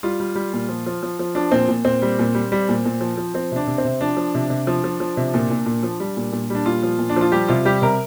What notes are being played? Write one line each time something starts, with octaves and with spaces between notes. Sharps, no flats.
G3 F4
G3
G3
A#2
F3
F3
F3
F3
F3 D4
A#2 C4
A#2
A#2 C4
G3
A#2
G3
G3
A#2
A#2
F3
F3
F3 C4
C3 D4
C3
C4
C3
F3 D4
F3
C3
C3
F3
F3
F3
C3
A#2
A#2
A#2
F3
G3
A#2
A#2
G3 D4
A#2 F4
F3
A#2
D4
F3 F4
G3 G4
C3 F4
G3 G4
C3 A#4